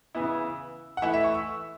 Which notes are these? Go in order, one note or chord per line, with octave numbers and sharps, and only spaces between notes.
C#3 E3 B3 E4
F#5
E3 A3 E4 E5
E5
C#6
E6